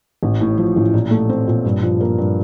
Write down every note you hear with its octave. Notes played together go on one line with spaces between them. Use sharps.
A1
A2
F3
A1
A#2
A3
C4
A#2
G2
F3
A#3
G2